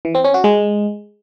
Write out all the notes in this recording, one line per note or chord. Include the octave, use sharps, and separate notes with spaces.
E3
C4
C#4
F#4
G#3